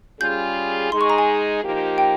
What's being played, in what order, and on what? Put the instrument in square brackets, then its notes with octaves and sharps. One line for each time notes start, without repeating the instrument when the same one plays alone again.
[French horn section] G3 C#4 F4 G#4 [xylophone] G6
[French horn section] G#3 D#4 G#4 [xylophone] C6
[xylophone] C#6
A#5
G#5
[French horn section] F3 A#3 D#4 G4
[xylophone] G5